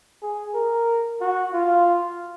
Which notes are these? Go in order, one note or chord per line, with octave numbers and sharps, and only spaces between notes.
G#4
A#4
F#4
F4